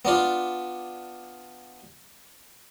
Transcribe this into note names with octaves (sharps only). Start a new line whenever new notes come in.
B3 D4 F4